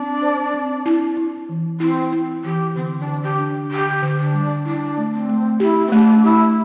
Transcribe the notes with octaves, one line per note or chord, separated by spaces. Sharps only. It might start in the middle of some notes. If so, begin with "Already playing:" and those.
Already playing: C4 D4
C5
C4
E4
E4
E3
C4 E4
E4
E3 G4
D3 C4
D4
D3
G4
D4
D3 G4
D3
D4
G3
D4 E4
A3
C4
A3
E4 G4
C4
A3 D4
E4 G4